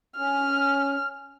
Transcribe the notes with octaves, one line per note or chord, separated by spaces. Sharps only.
C#4 F6